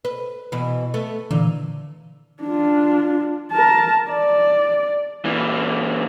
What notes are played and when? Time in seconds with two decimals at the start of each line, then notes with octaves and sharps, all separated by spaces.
0.05 B4
0.52 B2 E3
0.94 A3 B3
1.31 A#2 D3 E3
2.43 D4 F4
3.52 A#4 A5
4.11 D5
5.25 A#2 E3